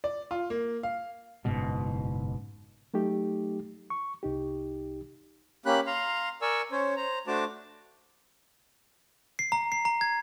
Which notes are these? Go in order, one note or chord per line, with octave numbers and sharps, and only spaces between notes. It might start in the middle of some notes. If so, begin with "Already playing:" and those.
D5
F4
A#3
F5
F#1 G#2 B2
F#3 A3 D#4 G4
C#6
C2 D#4 G4
A#3 C#4 G4 B5 F#6
F5 A#5 C6
A#4 D5 G#5 C#6 E6
C#4 C5 C#5
C5 A#5
A3 D4 F#4 C5 A5 D6
C7
A#5
C7
A#5
G#6